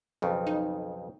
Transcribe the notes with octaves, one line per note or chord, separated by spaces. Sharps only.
B1 F2 C#3
D#4